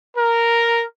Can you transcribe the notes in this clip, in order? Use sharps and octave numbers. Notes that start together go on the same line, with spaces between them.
A#4